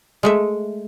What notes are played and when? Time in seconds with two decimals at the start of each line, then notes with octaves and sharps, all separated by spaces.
0.23 G#3 A3 E5